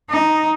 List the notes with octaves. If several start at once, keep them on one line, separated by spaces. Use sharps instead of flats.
D#4